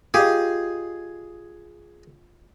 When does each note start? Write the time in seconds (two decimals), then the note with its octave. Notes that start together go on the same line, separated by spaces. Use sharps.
0.14 F4 G4 G#4 D#5